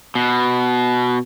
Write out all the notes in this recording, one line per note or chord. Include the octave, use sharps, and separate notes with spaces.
B2